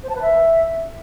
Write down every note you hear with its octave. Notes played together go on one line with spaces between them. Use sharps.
C5
A5
B4
E5